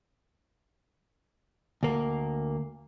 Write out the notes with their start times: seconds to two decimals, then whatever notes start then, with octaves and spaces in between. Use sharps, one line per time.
1.83 D2 A#3